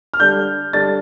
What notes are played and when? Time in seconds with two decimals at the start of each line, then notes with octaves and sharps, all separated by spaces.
0.14 F6
0.20 D3 G3 D4 G6
0.73 D3 G3 D4 A6